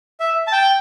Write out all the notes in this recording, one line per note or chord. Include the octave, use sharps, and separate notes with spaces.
E5
A5
G5